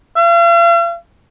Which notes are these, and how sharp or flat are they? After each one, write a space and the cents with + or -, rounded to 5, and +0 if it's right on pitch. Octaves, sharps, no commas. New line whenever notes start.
F5 -45